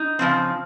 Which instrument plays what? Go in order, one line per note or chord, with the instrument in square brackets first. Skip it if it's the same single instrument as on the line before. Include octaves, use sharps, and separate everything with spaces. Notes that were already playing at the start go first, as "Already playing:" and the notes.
Already playing: [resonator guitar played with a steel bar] D#4
C#3 F3 C4